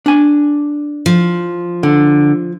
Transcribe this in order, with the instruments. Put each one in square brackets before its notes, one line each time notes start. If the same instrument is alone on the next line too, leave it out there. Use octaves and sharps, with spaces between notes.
[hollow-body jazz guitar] D4 G#5
[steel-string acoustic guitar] F3
[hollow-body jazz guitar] D3